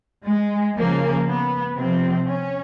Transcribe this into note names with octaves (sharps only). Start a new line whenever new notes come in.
G#3
C#3 F3 A#3
B3
C3 F3 C4
C#4